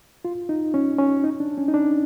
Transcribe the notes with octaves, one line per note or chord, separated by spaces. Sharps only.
F4
D#4
C#4
C#4
D#4
D4
C#4
D#4
D4